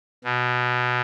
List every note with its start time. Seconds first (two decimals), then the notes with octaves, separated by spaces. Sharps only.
0.24 B2